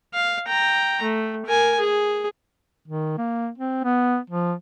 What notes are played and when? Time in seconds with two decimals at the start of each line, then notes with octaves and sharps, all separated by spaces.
0.14 F5
0.48 G5 A#5
1.03 A3
1.46 A#4 G#5
1.80 G#4
2.88 D#3
3.18 A#3
3.58 C4
3.84 B3
4.30 F3